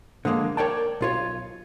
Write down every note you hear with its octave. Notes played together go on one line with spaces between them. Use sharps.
D3 F3 G#3 A#3
A#4 C#5 D5 G5 A5
B1 F4 C#5